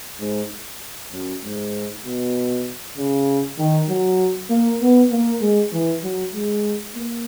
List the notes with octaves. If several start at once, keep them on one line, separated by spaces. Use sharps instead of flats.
G#2
F#2
G#2
B2
C#3
D#3
F#3
A#3
B3
A#3
G#3
E3
F#3
G#3
A#3